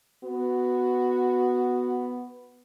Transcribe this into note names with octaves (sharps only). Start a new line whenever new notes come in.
B3 F#4